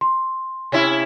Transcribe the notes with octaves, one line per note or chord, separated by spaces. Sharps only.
C6
C3 C#4 E4